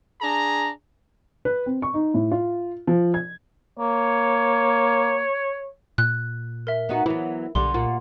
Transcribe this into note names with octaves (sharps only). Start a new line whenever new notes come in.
D4 G#4 A#5
B4
C4
C#6
D#4
A2
F4
F3
G#6
A#3 C#5
A#2 F#6
A#4 E5
B3 D#4 F#4
E3 F#3 B3 E4
B1 D3 G3 C6
A#2 F4 F#4